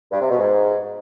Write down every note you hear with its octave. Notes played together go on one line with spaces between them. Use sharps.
G2
C3
B2
G#2